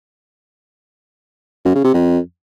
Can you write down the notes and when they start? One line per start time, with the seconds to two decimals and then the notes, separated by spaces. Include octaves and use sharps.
1.65 F#2
1.75 C#3
1.84 C3
1.94 F2